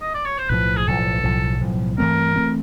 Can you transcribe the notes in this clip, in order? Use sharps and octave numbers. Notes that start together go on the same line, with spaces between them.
D#5
D5
C#5
C5
B1 A2 F3 B4
G#4
B1 A2 F3 A4
B1 A2 F3
B1 A2 F3
G2 E3 A3 C4 A#4
E3 A3 C4